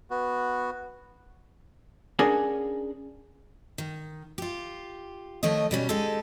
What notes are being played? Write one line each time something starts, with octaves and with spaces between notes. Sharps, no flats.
B3 F#4
C#4 D4 G#4 A#4 F#5 G#5
D#3
F4 G4
D#3 F3 A3 C#5 D#5
B2 G3 C#4 G4
G#3 D#4 G4 A4